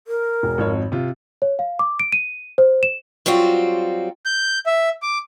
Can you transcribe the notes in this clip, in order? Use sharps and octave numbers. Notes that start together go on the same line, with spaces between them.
A#4
E1
G#1 F2 C#5
C3 F4
C#5
F5
D6
D7
D#7
C5
E7
F#3 G3 C4 F4 F#4
G6
E5
D6